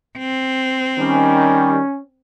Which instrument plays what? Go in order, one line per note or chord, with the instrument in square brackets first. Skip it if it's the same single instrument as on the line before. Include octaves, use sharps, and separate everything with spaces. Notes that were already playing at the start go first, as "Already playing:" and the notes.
[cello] C4
[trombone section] D#3 G3 [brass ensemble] C#4